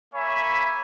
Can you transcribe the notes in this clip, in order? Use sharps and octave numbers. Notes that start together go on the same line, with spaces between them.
A#3 C#5 E5 G#5 B5